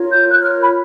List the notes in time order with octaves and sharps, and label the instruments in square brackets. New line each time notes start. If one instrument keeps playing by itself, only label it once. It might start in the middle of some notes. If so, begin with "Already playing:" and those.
Already playing: [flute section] F4 A#4 C#5
G6
F4 A#4 C#5 F#6
F6
B5